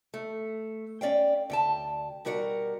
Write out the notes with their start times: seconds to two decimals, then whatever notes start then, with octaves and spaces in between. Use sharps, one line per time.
0.14 A3
1.01 C#4 D5 F5 G5
1.50 D2 G5 A5
2.25 B2 G3 F#4 A#4 E5 F#5